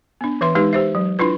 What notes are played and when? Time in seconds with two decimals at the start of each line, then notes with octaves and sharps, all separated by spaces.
0.21 B3 D4
0.41 E3 B4 E5 C6
0.55 G#3 D#4 G4 B4
0.73 G4 C5 E5
0.95 F#3
1.19 D4 E4 F4 B4